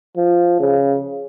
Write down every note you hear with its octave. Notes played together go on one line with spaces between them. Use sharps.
F3
C#3